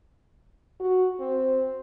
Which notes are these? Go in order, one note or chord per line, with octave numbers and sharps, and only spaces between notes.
F#4
C4